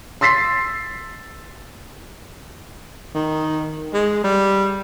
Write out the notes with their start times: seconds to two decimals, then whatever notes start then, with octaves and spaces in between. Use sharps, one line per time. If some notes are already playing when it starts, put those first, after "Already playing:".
0.21 C6 E6 A6 B6 C7
3.15 D#3
3.94 G#3
4.24 G3